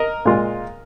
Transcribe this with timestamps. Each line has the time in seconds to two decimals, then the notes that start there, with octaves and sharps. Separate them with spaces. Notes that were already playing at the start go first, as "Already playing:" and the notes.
Already playing: A#4 D#5
0.25 A#2 G#3 F4